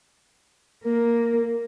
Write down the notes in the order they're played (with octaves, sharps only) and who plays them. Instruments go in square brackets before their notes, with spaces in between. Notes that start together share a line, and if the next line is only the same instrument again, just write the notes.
[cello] A#3 [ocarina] A#4